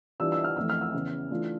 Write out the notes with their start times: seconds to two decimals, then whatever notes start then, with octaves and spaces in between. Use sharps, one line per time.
0.20 E3 G3 D4 F4 E6
0.32 E6
0.44 F6
0.56 F2 E3 A3 E6
0.70 F6
0.81 E6
0.94 E2 C#3 E3
1.31 E3 A3 D4 F4